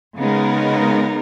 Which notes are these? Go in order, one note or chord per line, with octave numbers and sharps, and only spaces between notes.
C#3 G#3 B3 D#4 A#4